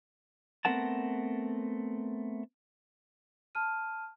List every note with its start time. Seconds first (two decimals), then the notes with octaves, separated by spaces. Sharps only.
0.65 A3 B3 C4 A#4 F#5 A5
3.55 A5 F6 D#7